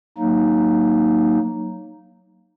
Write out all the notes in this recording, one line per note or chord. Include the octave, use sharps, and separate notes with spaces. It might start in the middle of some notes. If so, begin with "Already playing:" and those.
F#3 A#3 D#4